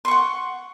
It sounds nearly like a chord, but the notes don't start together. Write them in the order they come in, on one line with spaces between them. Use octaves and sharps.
C6 C#6 F#5